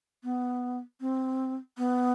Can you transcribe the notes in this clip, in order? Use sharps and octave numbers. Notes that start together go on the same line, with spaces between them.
B3
C4
B3